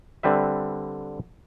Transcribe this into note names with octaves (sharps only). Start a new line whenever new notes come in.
D3 G3 C4 B4 E5